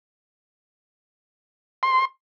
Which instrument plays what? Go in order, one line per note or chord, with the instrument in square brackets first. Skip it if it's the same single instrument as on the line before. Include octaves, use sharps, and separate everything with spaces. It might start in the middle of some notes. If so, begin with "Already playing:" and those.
[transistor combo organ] C6